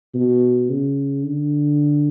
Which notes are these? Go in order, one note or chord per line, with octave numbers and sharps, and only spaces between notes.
B2
C#3
D3